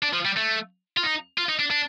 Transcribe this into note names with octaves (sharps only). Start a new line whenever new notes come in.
D4
F3
G3
A3
F4
D#4
F4
D#4
D4
D4